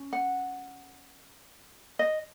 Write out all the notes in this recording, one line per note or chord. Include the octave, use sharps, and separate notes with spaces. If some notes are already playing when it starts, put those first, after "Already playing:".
Already playing: C#4
F#5
D#5